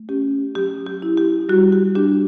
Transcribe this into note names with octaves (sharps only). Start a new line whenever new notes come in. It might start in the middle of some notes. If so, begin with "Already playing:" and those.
Already playing: A3
C#4 G4
F#3 G4
G4
E4
G4
G3 F#4
G4
D4 G4